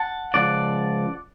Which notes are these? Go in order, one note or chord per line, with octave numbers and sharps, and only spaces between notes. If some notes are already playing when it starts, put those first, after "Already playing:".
Already playing: F#5 A5
C#2 C#3 F3 D5 F#5